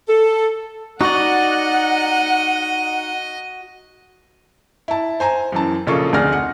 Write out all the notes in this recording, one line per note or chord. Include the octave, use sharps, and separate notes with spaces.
A4
D#4 F#4 D5 D#5 F#5
E4 A5
C5 G#5 A#5
F#2 E3 A5
A#1 C#3 A#3 F4 A4 C#6
F1 D2 G#4 D5 F6 A#6
F#5